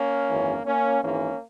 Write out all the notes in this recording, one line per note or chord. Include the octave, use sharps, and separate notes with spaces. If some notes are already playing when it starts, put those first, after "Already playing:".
Already playing: A#3 C#4
G#1 F#2 E3
A#3 C#4
G#1 G#2 E3 A#3 C#4